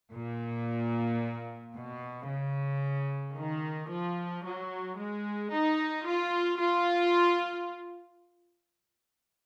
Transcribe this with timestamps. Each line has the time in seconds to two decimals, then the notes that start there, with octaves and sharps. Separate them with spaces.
0.13 A#2
1.75 B2
2.29 C#3
3.36 D#3
3.90 F3
4.44 F#3
4.97 G#3
5.51 D#4
6.05 F4
6.59 F4